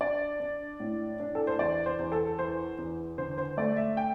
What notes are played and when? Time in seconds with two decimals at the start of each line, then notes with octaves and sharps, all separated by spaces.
0.01 D4 D5
0.40 D4
0.80 A2
1.20 D4
1.35 A4
1.47 C5
1.59 E2 D5
1.86 C5
1.99 E2
2.12 A4
2.38 E3 C5
2.78 E2
3.18 D3 C5
3.38 C5
3.57 A3 D5
3.77 E5
3.97 G5